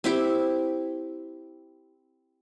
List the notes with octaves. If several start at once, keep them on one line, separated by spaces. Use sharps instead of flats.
C4 E4 G4